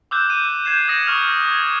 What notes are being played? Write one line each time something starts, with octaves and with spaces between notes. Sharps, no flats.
D6 E6 F#6 G6 E7
D#7
G6 G#6 C7 E7
D#6 A#6 C#7
C#6 D#6 F6 F7
D6 G#6